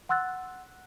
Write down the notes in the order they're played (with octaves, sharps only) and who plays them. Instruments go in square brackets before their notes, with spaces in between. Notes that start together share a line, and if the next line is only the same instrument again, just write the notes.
[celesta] F#5 C6 E6 F#6 A6